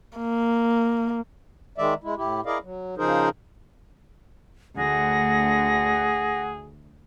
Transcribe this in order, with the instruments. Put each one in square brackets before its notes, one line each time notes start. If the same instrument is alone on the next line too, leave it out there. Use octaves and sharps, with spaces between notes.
[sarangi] A#3
[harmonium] D#3 G#3 D5 E5
G#3 E4
A2 E4 G4
E4 G#4 A#4 D5 D#5 F5
F#3
C#3 F3 D#4 G#4 A#4 C5
[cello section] D2 [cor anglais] G#4 [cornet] F#5 [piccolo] A#6